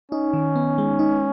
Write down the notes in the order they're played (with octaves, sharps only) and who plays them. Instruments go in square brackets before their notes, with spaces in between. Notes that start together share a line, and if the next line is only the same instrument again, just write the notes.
[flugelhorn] C#4 [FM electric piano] D#4
[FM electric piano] D#3
B3
G#3
D#4